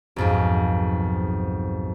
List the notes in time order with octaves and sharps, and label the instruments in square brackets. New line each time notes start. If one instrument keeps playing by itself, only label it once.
[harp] B1 F2 G#2